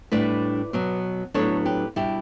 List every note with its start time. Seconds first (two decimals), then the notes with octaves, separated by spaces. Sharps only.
0.12 A2 G3 D4 B4 D5
0.73 B2 F#3 B3
1.34 A2 F#3 B3 D4 A4 C#5
1.65 G4 B4
1.96 B2 G3 D4 E4 G4